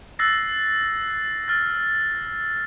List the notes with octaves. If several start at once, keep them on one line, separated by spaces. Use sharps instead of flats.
E6 F#6 A6 A#6 C7
F6 A6